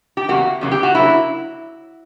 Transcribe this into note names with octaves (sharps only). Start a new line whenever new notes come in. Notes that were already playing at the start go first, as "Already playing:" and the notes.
G4
E2 C#3 F#3 A#3 F#4
E2 C#3 F#3 A#3
G4
F#4
C#3 F#3 A#3 E4